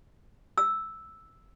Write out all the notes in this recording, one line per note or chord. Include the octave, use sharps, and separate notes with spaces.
E6